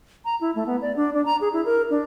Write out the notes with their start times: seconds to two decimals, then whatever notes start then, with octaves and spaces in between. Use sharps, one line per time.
0.25 A#5
0.41 E4
0.55 A3
0.66 B3
0.82 D5
0.96 D4
1.14 D4
1.26 A#5
1.41 G#4
1.53 E4
1.66 A#4
1.90 D4